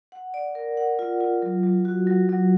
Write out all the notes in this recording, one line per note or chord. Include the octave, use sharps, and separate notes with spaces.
F#5
D5
A#4
F#5
F4
F4
F#3
F#3
F#4
F#3
F#3